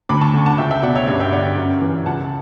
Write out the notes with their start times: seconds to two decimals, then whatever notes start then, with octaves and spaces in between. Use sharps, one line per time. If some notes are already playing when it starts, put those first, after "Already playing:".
0.09 D2 B5 D6
0.21 A5 C#6
0.34 D3
0.46 F#5 A5
0.58 C#2 E5 G5
0.71 E5 G5
0.82 B2 D5 F#5
0.95 C#5 E5
1.07 G2 C#5 E5
1.20 E5 G5
1.33 D3 D5 F#5
1.57 F#2
1.82 E3
2.06 C#2 F#5 A5